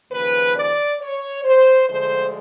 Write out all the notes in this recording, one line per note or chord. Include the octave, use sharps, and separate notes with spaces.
D#2 C#3 F3 B4
D5
C#5
C5
D2 D3 F3 G#3 C5